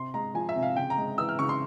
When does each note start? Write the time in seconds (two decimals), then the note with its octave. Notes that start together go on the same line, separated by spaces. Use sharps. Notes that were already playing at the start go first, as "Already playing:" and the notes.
Already playing: C3 C6
0.14 G#3 A#5
0.35 F3 G#5
0.49 E5
0.56 C3
0.63 F5
0.76 C#3 G5
0.90 A#5
0.97 G#3
1.18 E3 E6
1.29 F6
1.39 C#3 C#6
1.49 C6